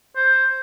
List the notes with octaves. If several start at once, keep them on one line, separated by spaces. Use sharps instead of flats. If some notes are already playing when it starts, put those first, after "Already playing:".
C5